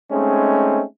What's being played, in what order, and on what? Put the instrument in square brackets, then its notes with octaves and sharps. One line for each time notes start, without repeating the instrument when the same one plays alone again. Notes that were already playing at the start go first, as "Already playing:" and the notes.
[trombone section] G#3 A3 C4 C#4 D#4